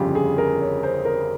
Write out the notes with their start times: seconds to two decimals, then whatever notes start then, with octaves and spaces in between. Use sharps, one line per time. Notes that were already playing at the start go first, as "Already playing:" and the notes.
Already playing: G1 F2 C#3 F4 G4
0.15 G#4
0.38 A#4
0.61 C#5
0.83 C5
1.05 A#4